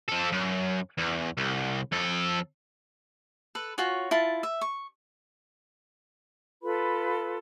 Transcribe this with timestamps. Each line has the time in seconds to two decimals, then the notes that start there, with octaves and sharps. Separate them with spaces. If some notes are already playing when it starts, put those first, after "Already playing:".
0.08 F3 A4
0.32 F#2
0.98 E2
1.37 C2
1.92 F2 A4
3.55 A4 B4
3.78 F4 F#4 C#5 G#5
4.11 E4 F4 A5
4.43 E5
4.61 C#6
6.63 F4 A4 B4 B5